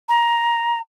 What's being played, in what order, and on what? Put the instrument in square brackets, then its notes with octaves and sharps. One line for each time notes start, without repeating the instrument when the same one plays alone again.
[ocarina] A#5